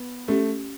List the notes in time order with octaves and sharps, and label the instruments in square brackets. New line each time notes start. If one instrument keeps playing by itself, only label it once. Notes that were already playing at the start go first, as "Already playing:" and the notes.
Already playing: [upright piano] B3
[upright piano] A3 [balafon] C#4 G4